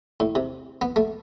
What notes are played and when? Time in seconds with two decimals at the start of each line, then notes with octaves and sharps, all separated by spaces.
0.20 A2
0.35 C3
0.81 B3
0.96 A3